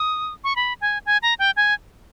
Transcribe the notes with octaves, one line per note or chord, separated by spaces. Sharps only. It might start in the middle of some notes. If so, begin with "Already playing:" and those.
Already playing: D#6
C#6
B5
G#5
G#5
A#5
G5
G#5